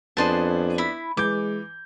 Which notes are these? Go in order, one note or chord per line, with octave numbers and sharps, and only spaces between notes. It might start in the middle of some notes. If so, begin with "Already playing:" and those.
F2 B3 D4 G#4 C5 A5
E4 B5
E3 G#3 D6 G6